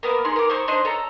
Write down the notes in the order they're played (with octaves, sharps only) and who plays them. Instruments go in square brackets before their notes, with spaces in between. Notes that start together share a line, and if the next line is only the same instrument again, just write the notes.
[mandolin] A#3 B3 A#4
D#4 G#4 C6
A#4 D6
D#4 C5 C#6
D4 D#4 C5 D#5
A4 C#5 A#5